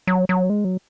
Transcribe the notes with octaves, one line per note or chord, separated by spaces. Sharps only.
F#3
F#3
G#3
F#3